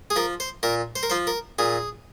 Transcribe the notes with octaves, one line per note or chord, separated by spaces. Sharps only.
G#4
F3 A#4
C5
A#2 A#4
C5
A#4
F3 C5
A#4
A#2 G#4